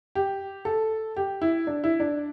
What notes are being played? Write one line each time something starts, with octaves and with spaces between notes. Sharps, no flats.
G4
A4
G4
E4
D4
E4
D4